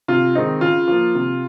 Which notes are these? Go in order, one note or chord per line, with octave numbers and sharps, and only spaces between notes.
C3 F4
D#3 G#3 C4 D#4
C#3 F4
F3 A#3
C3